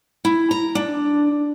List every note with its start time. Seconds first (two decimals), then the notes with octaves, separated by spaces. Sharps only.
0.25 E4
0.51 A#5
0.75 D4